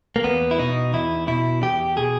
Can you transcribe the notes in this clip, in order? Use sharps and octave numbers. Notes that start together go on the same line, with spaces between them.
A#3
E2 B3
E4
B2 D#4
E2 E4
B2 E4
E2 G4
B2 G#4